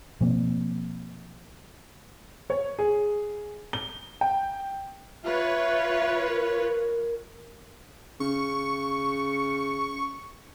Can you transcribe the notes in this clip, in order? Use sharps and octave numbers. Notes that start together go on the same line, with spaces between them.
B2 F3 A#3 C4
C#5
G#4
G7
G5
F4 B4 C#5 E5
A#4
C#3 C#6